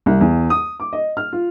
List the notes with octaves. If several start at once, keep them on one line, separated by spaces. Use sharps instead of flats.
C2
E2
D#6
D6
D#5
F6
F4